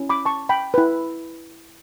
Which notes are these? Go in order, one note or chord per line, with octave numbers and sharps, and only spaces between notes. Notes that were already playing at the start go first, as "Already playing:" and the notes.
Already playing: C#4 E4
B5 D6
A5 C#6
G5 B5
E4 B4